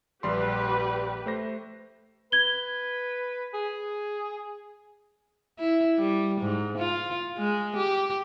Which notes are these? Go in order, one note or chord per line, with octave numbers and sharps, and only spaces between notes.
A#1 G3 G4 B4 C6
A3 C5 A#6
B4 G#6 G7
G#4
E4
G3
G#2
F4
G#3
G4